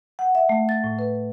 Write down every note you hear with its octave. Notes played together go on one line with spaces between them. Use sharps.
F#5
E5
A3
A6
A2
B4